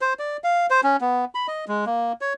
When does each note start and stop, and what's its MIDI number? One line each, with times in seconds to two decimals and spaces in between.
0.01 0.13 72
0.19 0.37 74
0.44 0.66 77
0.70 0.81 72
0.84 0.96 61
1.01 1.25 59
1.35 1.47 83
1.48 1.65 75
1.68 1.85 56
1.86 2.12 58
2.21 2.33 73